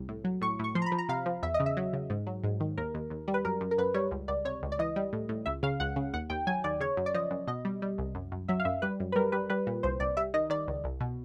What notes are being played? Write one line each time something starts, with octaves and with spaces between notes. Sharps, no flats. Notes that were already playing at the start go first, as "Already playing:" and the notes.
Already playing: C2
A2
F#3
A2 C#6
A2 C#6
F3 C6
A#5
B5
F3
A#5
C3 F5
F3
E2 E5
D#5
C#3
E5
F#3
C#3
G#2
F#3
G#2
D#3
D#2 A#4
D#2
D#2
G3
B4
F#2 A#4
F#2
A#4
F#2 B4
G3 C#5
C#2
C#2 D5
C3 C#5
C#2
D5
E3 D#5
G3
A2
A2
C#2 E5
C#3 F5
C#2 F#5
C#3
D#2 F#5
D#2 G5
F#3 G#5
D#2 D5
C#3 C#5
F#2
D5
F3 D#5
F#2
B2 D#5
G3
G3
C2
F#2
F#2
F#3 E5
F5
F#2 E5
G3 B4
F#2
B4
G3 A#4
G3 B4
G3 B4
A#2
C2 C5
C2 D5
G3 E5
D#3 D#5
D#3 D5
C#2
C2
B2